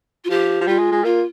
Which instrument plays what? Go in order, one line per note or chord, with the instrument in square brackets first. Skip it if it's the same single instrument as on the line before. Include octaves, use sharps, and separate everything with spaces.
[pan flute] F4
[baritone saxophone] F3 [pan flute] G4
[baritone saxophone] F3
[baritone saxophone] G3 [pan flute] F4
[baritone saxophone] G#3
G#3
[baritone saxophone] A#3 [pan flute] F4